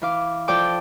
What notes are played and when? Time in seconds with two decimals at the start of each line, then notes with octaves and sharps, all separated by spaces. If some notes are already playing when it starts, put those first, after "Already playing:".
0.02 E3 F5 D6
0.48 F3 A4 D5 G5 D6 G6